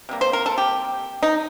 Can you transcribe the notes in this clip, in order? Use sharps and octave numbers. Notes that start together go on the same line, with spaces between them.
C3 G3 A#3
C5
A#4
A4
G4
D#4